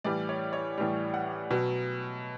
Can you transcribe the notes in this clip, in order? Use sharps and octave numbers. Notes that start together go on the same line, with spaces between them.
A2 E3 G3 D5
C#5
C#5
A2 E3 G3
F#5
B2 F#3